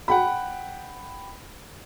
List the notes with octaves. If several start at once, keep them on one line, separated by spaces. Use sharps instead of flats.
F#5 G5 B5